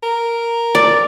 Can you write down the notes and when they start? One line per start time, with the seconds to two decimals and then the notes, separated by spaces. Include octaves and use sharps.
0.03 A#4
0.75 D5